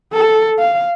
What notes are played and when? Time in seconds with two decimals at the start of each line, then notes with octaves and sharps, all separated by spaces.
0.13 A4
0.59 F5